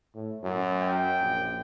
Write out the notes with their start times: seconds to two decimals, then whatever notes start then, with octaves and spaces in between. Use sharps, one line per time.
0.14 A2
0.43 F#2
0.82 G5
1.21 A#1